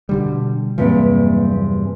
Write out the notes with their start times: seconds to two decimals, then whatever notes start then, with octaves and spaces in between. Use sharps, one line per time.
0.09 B2 D3 G3
0.78 E2 G2 C3 F#3 A#3